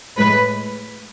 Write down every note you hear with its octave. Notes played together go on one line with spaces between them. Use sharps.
A2 G#3 B4